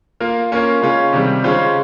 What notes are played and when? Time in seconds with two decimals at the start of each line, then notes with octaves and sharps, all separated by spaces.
0.20 A#3 F4 A#4
0.52 A#3 C#4 F4 A#4
0.82 C#3 G#3 C#4 F4
1.13 C3 D#3 G3
1.44 C#3 G#3 C#4 F4 C5